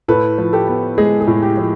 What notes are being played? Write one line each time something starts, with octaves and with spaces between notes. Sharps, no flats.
A2 A4 B4
F3
G4 A4
B3
G#3 G#4
G#4
A2
G4
F3